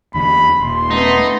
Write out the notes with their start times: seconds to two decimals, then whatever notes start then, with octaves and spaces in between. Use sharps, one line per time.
0.14 E2 D3 B5
0.60 D#1 C6
0.91 A3 B3 D#4